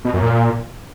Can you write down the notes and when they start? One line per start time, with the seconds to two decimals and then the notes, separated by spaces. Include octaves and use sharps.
0.05 B2
0.14 F#2
0.22 A#2